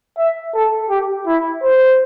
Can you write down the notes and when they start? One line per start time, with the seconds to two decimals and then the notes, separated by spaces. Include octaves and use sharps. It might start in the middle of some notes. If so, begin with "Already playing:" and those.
0.17 E5
0.54 A4
0.90 G4
1.27 E4
1.63 C5